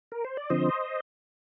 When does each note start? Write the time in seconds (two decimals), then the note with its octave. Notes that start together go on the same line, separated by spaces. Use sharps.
0.12 A#4
0.24 C5
0.37 D5
0.50 D3 F3 C4 C5 D#5